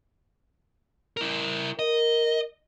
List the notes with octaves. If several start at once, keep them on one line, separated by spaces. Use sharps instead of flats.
E4 A#4
A#4 D#5